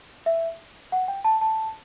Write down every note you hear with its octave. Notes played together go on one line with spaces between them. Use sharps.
E5
F#5
G5
A5
A5